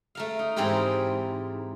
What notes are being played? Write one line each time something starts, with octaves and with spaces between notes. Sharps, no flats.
A3 A#4 F5
D#4
G#2 E3 C4 D#4 G4 A#4